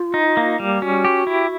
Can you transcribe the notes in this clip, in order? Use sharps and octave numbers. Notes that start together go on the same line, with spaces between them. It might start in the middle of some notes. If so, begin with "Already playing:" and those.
Already playing: F4
D#4
A#3
G3
G4
C#4 F#4
G4
E4